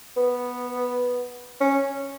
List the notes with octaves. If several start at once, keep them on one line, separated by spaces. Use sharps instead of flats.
B3
C#4